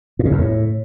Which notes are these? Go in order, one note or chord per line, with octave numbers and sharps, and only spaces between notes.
A2
C#3
E2
A2